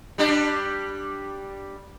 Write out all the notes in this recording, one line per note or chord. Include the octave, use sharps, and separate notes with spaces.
G3 D4 G4